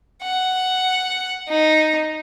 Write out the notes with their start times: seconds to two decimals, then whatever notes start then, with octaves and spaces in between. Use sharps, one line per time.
0.23 F#5
1.48 D#4